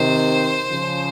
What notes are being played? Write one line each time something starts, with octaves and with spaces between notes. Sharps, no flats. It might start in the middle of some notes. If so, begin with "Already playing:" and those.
Already playing: C3 D#3 C5
C#3 F3